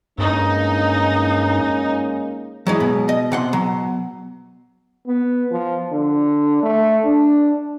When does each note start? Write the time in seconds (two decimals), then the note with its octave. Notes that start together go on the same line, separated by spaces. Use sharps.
0.18 G2 G#3 A#3 C#4 D#4
2.67 E3 F#3 G#3 D#4 E4
2.80 B2
3.09 D#5
3.32 C3 F#5 C6
3.53 F#3
5.07 B3
5.51 F3
5.92 D3
6.63 A3
7.05 D4